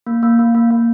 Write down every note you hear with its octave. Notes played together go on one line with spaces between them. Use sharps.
A#3
A#3
A#3
A#3
A#3